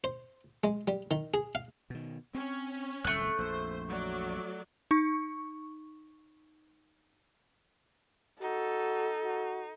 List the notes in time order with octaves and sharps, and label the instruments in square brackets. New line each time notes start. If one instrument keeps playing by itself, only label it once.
[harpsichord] C5
G#3
G3
D#3
G#4
F5
[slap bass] B2 D#3
[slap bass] C4 [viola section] C#4
[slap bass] D1 C2 F2 [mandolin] A3 F#6
[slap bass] A#1 F2 [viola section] C5
[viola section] F#3 D5
[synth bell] D#4 C#6
[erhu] D#4 [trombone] F#4 [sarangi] A4
[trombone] F#4